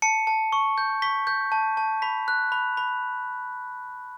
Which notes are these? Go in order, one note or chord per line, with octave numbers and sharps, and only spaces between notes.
A5 C#7
A5
C#6
G6
C#6 B6
G6
A5
A5
B5 B6
F#6
B5
B5